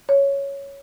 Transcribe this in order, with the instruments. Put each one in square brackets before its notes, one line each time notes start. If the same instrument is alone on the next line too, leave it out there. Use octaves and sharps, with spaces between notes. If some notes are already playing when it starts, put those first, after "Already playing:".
[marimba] C#5